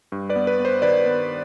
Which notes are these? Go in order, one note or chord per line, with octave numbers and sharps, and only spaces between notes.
G2
B4 D5
B3
B4
B3
C5
D#3 B4 D5
B3